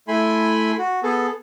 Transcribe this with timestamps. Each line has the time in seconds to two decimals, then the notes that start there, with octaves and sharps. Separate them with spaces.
0.08 A3 E4 G#5 B5 C6
0.78 F#4
1.03 B3 G#4 A4